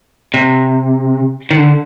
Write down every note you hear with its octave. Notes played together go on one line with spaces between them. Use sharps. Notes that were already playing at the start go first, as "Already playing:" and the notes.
C3
D#3
D3